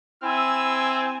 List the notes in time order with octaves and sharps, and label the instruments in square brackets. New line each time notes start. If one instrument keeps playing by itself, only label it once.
[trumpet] C4 [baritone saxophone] E4 [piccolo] G#5 [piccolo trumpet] E6